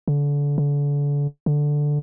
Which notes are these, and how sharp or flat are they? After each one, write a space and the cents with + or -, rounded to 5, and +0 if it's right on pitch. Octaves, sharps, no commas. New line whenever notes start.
D3 -30
D3 -35
D3 +0